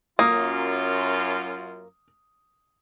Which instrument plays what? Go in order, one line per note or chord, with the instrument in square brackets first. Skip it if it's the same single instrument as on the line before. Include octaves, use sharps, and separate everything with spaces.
[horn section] F#2 F4 [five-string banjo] A#3 [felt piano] D#6